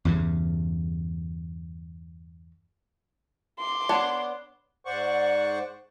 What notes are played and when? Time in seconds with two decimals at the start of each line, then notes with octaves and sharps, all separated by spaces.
0.05 E2 G2 C#3
3.58 C6 D6
3.89 B3 D4 C#5
4.85 G#2 C5 D5 F#5 C#6